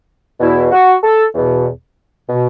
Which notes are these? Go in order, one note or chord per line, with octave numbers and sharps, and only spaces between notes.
E2 B2 E4
F#4
A4
E2 B2
B2